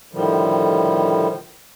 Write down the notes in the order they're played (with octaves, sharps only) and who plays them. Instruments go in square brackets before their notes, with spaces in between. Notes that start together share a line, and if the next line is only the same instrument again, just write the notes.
[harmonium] A2 D3 D#3 F3 G3